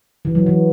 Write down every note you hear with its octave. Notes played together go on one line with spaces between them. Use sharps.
E3
F#3
E3